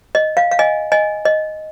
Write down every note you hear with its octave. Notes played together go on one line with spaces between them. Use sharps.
D#5
F5
F5
D#5 G#5
D#5 G#5
D#5